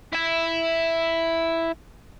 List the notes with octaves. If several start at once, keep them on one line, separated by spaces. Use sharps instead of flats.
E4 E5